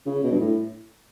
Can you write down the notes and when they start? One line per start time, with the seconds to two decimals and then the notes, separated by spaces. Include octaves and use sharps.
0.06 C#3
0.24 B2
0.31 G2
0.39 A2